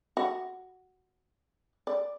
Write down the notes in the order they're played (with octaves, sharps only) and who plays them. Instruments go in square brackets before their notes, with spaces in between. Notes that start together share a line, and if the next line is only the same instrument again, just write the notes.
[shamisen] F#4
D5